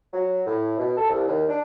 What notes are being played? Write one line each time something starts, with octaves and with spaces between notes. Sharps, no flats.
F#3
A2
B2
A4
C2
D#2
D4